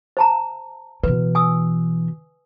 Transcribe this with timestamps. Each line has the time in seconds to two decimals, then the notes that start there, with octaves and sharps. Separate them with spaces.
0.17 C5 A5 A#5
1.03 B2 E3 B4
1.35 G#5 D#6 E6